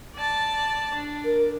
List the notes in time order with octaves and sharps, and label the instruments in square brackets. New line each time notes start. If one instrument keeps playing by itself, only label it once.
[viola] D5 A5
D4
[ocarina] A#4